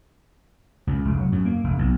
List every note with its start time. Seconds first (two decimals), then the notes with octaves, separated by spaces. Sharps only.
0.87 C#2
1.05 F1
1.19 F#3
1.32 F#2
1.45 A#3
1.64 F1
1.79 B1